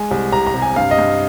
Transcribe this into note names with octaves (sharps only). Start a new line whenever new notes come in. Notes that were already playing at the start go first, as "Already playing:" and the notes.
Already playing: G#3 G#5
C2
C3 A#5
A#5
C3
G#5
G2 F5
D#5
G2